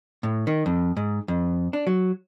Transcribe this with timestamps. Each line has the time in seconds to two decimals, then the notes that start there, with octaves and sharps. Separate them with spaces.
0.23 A2
0.47 D#3
0.66 F2
0.97 G#2
1.28 F2
1.73 D4
1.87 F#3